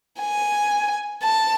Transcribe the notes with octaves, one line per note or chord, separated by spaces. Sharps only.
G#5
A5